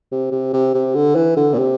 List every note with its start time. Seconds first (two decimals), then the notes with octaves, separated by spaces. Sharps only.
0.11 C3
0.32 C3
0.53 C3
0.75 C3
0.95 D3
1.15 E3
1.37 D3
1.54 A#2
1.59 C3